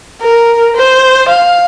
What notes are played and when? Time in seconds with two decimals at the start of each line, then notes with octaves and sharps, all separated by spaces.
0.21 A#4
0.76 C5
1.29 F5